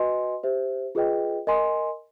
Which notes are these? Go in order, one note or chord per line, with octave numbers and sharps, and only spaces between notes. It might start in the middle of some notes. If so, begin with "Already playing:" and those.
Already playing: F#4 B4 D#5 G#5 C6
G4 C5 E5
F4 G#4 B4 D#5 G5
A#4 D#5 G#5 C6